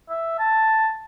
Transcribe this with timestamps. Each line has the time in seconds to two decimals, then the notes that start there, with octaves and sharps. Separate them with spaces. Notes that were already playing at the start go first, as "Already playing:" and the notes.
0.09 E5
0.39 A5